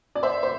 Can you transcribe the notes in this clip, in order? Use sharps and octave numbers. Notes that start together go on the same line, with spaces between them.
D5
C5 E5
C5